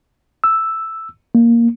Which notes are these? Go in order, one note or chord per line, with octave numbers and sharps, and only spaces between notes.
E6
A#3